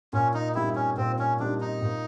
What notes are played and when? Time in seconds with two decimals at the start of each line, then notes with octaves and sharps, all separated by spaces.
0.13 A#2 C#4
0.34 D#4
0.55 G3 C4 D#4 E4 G4
0.76 C#4
0.97 A#2 C4
1.19 C#4
1.39 G3 C4 D4 D#4 G4
1.60 D#4
1.82 A#2